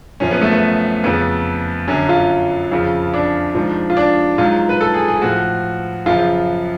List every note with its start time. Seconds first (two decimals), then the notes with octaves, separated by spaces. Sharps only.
0.20 F#2 F3 C#4
0.31 B3
0.41 A3
0.52 B3
1.04 F2 C#3 F3 B3
1.88 F#2 D3 F#3 C#4
2.09 F4
2.72 F2 C#3 F3
3.14 D4
3.55 G#2 F3
3.90 F4
3.97 D4
4.38 G#2 F#3 F4
4.69 B4
4.81 A4
4.94 G#4
5.08 G#4
5.22 A2 F3 F#4
6.06 F#2 C#3 F3 F4